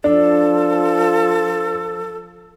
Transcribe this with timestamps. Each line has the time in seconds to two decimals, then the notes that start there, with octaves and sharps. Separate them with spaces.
0.04 F3 D4 A4